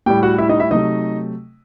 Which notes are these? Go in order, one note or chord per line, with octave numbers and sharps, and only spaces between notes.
A2 G3 G4 G5
F#4 F#5
E4 E5
D#4 D#5
E4 E5
C3 F#3 A3 D#4 D#5